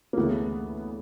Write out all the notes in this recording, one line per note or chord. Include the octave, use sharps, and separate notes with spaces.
A#3
D2 C#3 E3 A3 B3